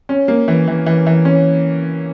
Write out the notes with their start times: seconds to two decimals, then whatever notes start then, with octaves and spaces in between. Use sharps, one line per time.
0.09 C#4
0.28 A#3
0.48 E3
0.67 E3
0.86 E3
1.06 E3
1.25 C#4